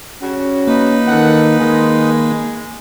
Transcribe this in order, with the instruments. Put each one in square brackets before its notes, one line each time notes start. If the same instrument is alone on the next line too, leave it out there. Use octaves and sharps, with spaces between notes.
[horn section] C#3 G3 F#4 [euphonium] C#4
[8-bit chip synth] A#3 [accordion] D#4 B4
[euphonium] D#3 [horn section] E3 A4 F#5
[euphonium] D#3 [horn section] G#3